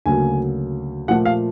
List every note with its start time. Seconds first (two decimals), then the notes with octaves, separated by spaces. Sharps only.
0.06 D2 C#3 F#3 A#3 G#5
1.08 A#2 F3 A3 F#5
1.25 F5